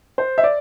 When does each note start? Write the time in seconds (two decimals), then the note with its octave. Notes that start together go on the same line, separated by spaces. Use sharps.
0.18 C5
0.38 E5
0.44 D5